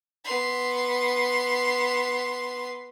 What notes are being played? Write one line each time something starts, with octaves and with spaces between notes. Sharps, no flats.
B3 C6